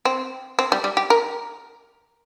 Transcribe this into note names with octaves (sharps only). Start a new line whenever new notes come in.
C4
C4
G3
G3
G4
A#4